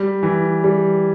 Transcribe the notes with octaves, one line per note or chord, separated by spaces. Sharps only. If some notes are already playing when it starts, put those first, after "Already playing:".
Already playing: G3
E3
G3